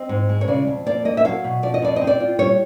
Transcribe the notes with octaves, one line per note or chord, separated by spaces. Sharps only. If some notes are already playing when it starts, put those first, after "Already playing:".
Already playing: C4 D#5
G#2
G#3
C#5
C#3 D5
F2
A#3 D5
A#3 D#5
E5
F#3 F5
B2
F3 D5
D#5
F2 D5
C4 D#5
D5
F4
G3 C#5